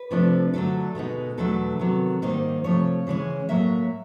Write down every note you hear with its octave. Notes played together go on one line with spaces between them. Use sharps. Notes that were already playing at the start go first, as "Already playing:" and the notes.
Already playing: B4
C3 F3 A3 D4
D3 F#3 A3 D4 A4
B2 G#3 B3 D#4
E2 B2 F#3 A3 D4 A4
C3 D#3 F#3 B3
G#2 D#3 G3 A#3 D#4 C5
C3 F3 A3 C#5
C#3 E3 G#3 C#4
A2 F#3 A#3 E5